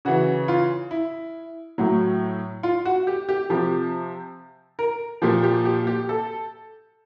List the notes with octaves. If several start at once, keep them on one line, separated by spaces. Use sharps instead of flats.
C#3 E3 F#4
F4
E4
A2 F#3
F4
F#4
G4
G4
C3 F3 G4
A#4
A#2 F3 G4
G4
G4
G4
A4